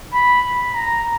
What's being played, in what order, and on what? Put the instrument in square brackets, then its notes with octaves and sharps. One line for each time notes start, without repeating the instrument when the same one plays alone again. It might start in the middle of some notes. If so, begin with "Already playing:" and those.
[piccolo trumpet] B5
A#5